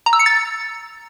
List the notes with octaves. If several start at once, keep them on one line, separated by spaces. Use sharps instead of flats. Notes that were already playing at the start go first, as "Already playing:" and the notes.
A#5
E6
C#7
A6